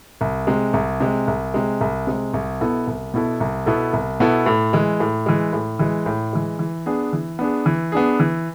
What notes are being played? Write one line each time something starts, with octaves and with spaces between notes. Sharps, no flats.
C2
C3 G#3
C2
C3 G#3
C2
C3 G#3
C2
C3 G#3
C2
B2 B3 E4 A4
C2
B2 B3 E4 A4
C2
B2 B3 E4 A4
C2
B2 B3 E4 A4
A2
E3 G#3
A2
E3 G#3
A2
E3 G#3
A2
E3 G#3
E3
B3 D4 G#4
E3
B3 D4 G#4
E3
B3 D4 G#4
E3